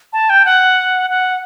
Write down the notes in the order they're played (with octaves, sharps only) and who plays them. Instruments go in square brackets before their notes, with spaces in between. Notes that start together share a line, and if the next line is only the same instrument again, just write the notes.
[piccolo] A5
G5
F#5
F#5